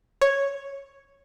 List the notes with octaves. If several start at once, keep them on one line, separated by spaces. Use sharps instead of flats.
C#5